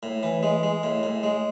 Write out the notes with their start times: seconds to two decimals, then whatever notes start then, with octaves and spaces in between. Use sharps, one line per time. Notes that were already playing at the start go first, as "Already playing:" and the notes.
0.03 A2
0.23 E3
0.43 G#3
0.63 G#3
0.83 A2
1.03 A2
1.23 G#3